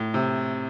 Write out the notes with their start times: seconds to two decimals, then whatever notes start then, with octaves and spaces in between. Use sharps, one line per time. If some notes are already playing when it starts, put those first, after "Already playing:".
Already playing: A2
0.14 C3